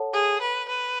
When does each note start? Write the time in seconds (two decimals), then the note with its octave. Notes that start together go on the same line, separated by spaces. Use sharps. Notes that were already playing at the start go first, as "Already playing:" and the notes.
Already playing: A4 C#5 F#5 A5
0.13 G#4
0.41 B4
0.69 B4